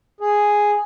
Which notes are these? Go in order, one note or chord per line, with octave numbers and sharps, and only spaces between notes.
G#4